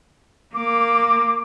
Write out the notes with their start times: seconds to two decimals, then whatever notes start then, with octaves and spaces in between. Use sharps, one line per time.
0.54 A#3 D6